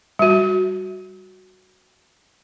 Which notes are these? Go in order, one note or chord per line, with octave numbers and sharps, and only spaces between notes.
G3 F#4